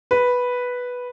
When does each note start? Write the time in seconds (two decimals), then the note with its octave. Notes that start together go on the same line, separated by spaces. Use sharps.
0.11 B4